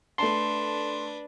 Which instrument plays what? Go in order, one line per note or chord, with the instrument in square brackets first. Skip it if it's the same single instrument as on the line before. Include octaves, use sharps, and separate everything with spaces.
[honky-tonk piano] A3 A5 [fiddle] D4 B4 [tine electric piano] C6